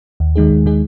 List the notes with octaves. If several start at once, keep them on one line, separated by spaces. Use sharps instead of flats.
D#2
D#3 G#3 D#4 G#4
D#2
D#3 G#3 D#4 G#4